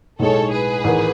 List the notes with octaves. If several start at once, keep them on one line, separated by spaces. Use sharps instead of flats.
B1 A2 G#3 D#4 G#4 A4 C#5
G#4 B4
A1 G#2 D#3